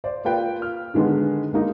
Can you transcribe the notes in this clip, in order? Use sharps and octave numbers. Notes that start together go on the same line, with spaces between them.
C5 D5
A#3 F4 B4 G5
F6
D3 D#3 G#3 B3
G#3 A#3 D#4